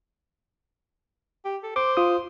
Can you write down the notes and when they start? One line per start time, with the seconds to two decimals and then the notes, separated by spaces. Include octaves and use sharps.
1.45 G4
1.63 A4
1.76 C5 D6
1.97 F4 D#6